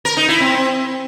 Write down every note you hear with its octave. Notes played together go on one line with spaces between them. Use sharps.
A#4
D#4
E4
C4